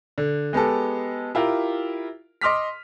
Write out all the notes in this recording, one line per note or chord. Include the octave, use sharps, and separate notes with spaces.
D3
G#3 B3 G4 A4
E4 F4 G4 A#4
D#5 C6 D6 F6 B6